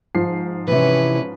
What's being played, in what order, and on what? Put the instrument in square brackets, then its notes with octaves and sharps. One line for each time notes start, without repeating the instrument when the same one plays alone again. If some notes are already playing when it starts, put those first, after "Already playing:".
[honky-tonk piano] G#2 F3 C7
[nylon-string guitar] C3 E3 [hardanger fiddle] C#4 B4